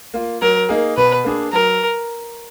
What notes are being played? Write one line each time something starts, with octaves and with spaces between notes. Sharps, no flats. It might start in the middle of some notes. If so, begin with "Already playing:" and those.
A#3 F4
F#3 A#4
A#3 D#4 G#4
B2 B4
A#3 D4 G#4
F#3 A#4